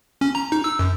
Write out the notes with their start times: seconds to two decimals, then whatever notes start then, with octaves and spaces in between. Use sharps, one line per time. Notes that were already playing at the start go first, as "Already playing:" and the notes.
0.21 C#4
0.35 A#5
0.52 D#4
0.64 E6
0.79 F#2